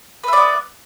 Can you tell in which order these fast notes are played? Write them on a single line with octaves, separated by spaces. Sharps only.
B4 E5 D5 B3